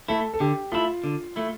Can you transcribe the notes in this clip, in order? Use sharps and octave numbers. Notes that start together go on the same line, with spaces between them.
A3 E4 A4
A4
D3 G4
A3 E4 F4
D3
A3 E4